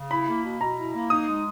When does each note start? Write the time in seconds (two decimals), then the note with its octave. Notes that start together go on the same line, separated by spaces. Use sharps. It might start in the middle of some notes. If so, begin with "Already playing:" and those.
Already playing: C#3
0.11 E4 B5
0.28 A#3
0.44 B2
0.61 B2 A#5
0.78 E4
0.94 A#3
1.10 D#4 D#6
1.28 G#3